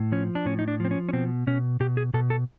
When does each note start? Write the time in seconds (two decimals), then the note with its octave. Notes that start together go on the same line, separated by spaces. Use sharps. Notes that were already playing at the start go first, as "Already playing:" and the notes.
Already playing: A2
0.12 F3 C#4
0.35 D4
0.45 A2 C#4
0.59 D#4
0.68 D4
0.80 F3 C4
0.91 C#4
1.09 C#4
1.13 B2 C4
1.47 B2 C#4
1.80 B2 G4
1.97 G#4
2.14 B2 A4
2.30 A4